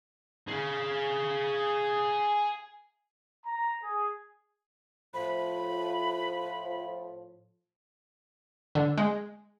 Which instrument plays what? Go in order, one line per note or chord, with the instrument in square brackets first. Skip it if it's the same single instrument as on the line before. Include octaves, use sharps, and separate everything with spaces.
[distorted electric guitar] G#4 F5
[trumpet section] A#5
G#4
[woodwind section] A2 F3 [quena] B5
[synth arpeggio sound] D3
G#3